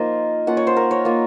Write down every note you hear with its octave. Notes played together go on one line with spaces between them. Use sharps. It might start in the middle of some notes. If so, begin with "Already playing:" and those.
Already playing: F3 A#3 D#4 F4 A#4 C5 D#5
A#3 C#4 F4 F#5
C#5
C5
A#4
C#5
A#3 F4